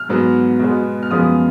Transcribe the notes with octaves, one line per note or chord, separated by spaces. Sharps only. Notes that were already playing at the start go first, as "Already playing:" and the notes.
Already playing: F6
G#2 F#3 B3
B2 G#3 B3
F6
F#2 F3 G#3 B3 D#6